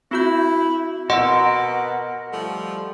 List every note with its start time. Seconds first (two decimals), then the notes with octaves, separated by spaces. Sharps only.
0.11 C4 E4 F#4 G6
1.10 B2 F#4 A#4 D#5 F#5 C6 E6
2.32 F3 G3 A3